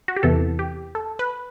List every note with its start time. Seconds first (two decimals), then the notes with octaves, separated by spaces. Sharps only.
0.08 F#4
0.16 G4
0.23 E2 C3 E3 B3 A4
0.59 G4
0.95 A4
1.19 B4